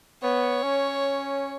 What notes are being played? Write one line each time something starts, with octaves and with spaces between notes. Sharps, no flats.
B3 C#5
C#4